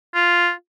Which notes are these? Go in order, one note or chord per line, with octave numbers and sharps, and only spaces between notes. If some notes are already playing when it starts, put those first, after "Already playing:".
F4